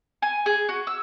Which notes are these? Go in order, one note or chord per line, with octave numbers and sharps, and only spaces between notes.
G#5
G#4
F#4
E6